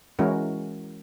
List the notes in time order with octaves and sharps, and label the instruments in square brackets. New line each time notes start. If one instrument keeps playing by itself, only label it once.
[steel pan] E3 G#3 C#4 E4 F#4 A#4